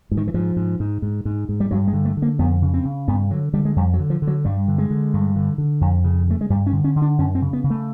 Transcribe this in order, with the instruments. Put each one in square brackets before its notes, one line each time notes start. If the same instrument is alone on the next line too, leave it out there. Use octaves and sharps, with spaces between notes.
[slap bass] G#2
D#3
E3
G#2 F3
G#2
G#2
G#2
G#2
G#2
G3
G2 F#3
G#3
D3
A3
D3
A#3
F2 B3
C#3
C4
C#3
G2 B3
D3 F#3
D3 G3
G#3
F2 G3
F#3
D3
F3
D3
F#3
G2 G3
D3
G#3
D3
G2
D3
D3
F2
C#3
C#3 A3
G#3
G2 G3
C#4
D3
C#4
D3
D4
F#2 C#4
C4
C#3
B3
C#3
A3